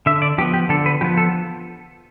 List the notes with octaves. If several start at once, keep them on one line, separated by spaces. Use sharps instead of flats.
D3 E5
D5
F3 B3 G4
G4
D3 A4
B4
F3 B3 G4
A4